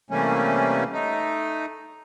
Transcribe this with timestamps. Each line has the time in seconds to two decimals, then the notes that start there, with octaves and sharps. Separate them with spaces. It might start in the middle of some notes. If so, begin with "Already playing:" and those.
0.11 C3 E3 G3 A3 A#3 C#4
0.93 A3 D#4